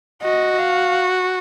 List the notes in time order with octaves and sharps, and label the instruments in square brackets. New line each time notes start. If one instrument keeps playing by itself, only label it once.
[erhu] F#4 [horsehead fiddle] D#5
[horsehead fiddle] F5